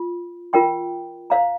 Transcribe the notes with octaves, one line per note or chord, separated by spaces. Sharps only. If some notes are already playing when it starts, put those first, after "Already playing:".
Already playing: F4
F4 A#4 G5 C6
C5 F5 A#5